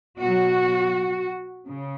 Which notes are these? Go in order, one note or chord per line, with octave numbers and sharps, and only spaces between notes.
B2 F#3 F#4
C#3